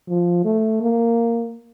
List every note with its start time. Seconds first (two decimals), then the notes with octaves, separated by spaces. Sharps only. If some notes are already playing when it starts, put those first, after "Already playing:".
0.09 F3
0.45 A3
0.82 A#3